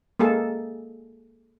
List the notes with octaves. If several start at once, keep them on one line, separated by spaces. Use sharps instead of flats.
G#3 A#3 G#4 A4